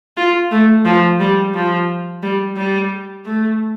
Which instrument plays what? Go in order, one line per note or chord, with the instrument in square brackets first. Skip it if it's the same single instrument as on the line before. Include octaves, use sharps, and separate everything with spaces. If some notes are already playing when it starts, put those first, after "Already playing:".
[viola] F4
A3
F3
G3
F3
G3
G3
A3